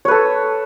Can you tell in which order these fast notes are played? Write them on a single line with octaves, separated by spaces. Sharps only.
C#5 B4 A4